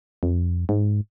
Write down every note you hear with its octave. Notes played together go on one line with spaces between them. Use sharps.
F2
G#2